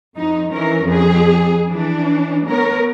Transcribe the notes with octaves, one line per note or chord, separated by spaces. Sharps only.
F2 D#4
E3 C#4 A#4
F2 G#4
E3 D4
B3 A#4 C#5